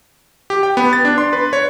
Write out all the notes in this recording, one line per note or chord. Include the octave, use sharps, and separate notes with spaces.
G4
G5
B3
A6
D4
C6
B4
C#5